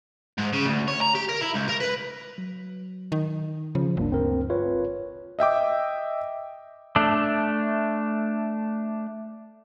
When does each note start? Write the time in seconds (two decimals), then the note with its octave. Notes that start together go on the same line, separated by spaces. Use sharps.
0.38 G#2
0.53 C#3
0.65 D2
0.88 C#5
1.01 A#5
1.15 G4
1.29 A#4
1.42 E4
1.55 C#2
1.69 A#4
1.81 B4
2.38 F#3
3.12 D#3
3.75 C#3 F3
3.97 G1 D2 A#3 D4
4.10 D2 C4 A#4
4.50 F4 B4 C#5
5.39 D#5 E5 G5 D6
6.96 A3 D4